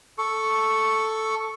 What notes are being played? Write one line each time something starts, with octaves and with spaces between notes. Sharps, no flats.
A4 C#6